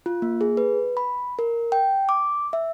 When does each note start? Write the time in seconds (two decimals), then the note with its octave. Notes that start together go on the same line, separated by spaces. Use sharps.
0.06 F4
0.22 A#3
0.41 G#4
0.57 B4
0.97 B5
1.39 A#4
1.72 G5
2.09 D6
2.53 E5